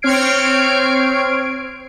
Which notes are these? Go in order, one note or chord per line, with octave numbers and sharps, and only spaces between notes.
C4 C#5 F6 G#6 C7 D7